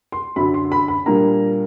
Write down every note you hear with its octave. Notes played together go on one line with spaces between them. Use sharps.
C6
F#2 D3 F#3 B5
C6
B5
B5
A#2 G3 A#3 D4 A#5